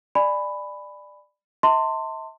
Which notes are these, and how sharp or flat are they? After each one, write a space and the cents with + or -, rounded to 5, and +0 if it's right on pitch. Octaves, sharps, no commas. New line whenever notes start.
D5 +15 G#5 +0 B5 +5
E5 -40 A5 +40 C6 +0